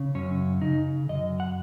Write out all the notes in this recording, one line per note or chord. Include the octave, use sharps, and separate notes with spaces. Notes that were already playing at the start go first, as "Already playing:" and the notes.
Already playing: C#3
F#2 C#4
C#3 D#4
F#2 D#5
F#5